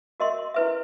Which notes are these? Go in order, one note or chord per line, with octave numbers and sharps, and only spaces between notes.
F#4 A#4 D#5 E5 C6
E4 B4 E5